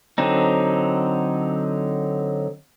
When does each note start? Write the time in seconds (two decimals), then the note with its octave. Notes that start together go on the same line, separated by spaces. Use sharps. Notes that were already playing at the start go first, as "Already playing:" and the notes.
0.18 D3 F#3 C4 D#4